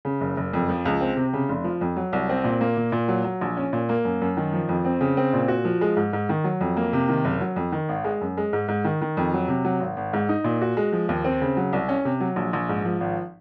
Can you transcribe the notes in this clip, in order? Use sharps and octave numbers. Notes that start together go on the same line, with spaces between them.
C#3
F#1
F#1
F2
F3
C#2
C4
C3
C#3
F1
F3
F2
F#3
C2
C4
A#2
A#3
A#2
A#2
F#3
F#3
A#1
C#4
A#2
A#3
F#2
F#2
D#3
F3
F2
C4
C#3
C4
A#2
F#4
F3
G#3
G#2
G#2
D#3
F#3
F2
A#3
C3
D#3
F#1
F#3
F2
D#3
G#1
G#3
F#2
G#3
G#2
G#2
D#3
D#3
F2
F#3
C3
F#3
G#1
G#1
G#2
D#4
A#2
F#4
G#3
F3
D#2
C4
C#3
F#3
C2
C#4
C3
F#3
A#1
A#1
G#2
F3
G#1